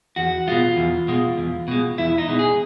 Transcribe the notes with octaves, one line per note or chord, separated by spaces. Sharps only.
E2 F#4
B2 G#3 F4
E2
B2 G#3
E2
B2 G#3
E2 E4
D#4
B2 G#3
G#4